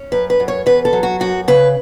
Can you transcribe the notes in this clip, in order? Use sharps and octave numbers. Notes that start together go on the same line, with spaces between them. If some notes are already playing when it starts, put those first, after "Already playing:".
Already playing: C#4
F#2 B4
B4
F#2
C#5
E2 B4
A4
F#3
F#4
F#2 F#4
C#3 B4